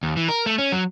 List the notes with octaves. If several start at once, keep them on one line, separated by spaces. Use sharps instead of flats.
D#2
E3
A#4
A3
C#4
F#3